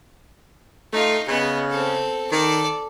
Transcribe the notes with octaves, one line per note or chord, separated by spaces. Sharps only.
A3 D#4 F4
C#3 B3 D#5
C4 A4
D#3 A4 D5